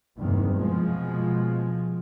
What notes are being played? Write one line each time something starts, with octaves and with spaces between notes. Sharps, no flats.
F#1 E2 G2 C3 D#3
B2 F3 G#3